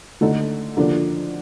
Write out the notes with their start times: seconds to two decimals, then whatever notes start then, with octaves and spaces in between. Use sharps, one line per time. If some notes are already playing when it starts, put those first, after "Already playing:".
0.21 D3 A3 D#4 A4
0.77 D3 F3 A#3 D4